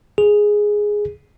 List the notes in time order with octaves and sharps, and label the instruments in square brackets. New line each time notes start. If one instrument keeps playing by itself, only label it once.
[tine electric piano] G#4